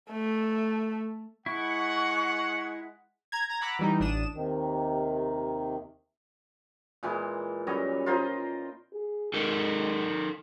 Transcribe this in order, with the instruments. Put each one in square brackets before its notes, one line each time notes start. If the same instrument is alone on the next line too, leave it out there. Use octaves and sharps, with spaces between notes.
[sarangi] A3
[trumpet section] G#3 F#5 [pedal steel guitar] E4 [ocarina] C#6
[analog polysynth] A#5 G#6
A#5 G#6
F#5 A#5 B5 D6 E6 F#6
E3 G3 D#4
A1 D4 D#6 E7
[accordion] D#2 C3 D#3
[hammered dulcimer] A#2 E3 G#3
F#2 G3 C#5 D#5
F4 A#4 C5 D#5
[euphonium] G#4
[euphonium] G#3 [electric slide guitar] D#4 A4 A#4